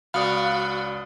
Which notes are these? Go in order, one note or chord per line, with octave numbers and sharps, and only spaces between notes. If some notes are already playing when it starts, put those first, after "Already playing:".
C#2 F#4 D5 F5 B5 D#6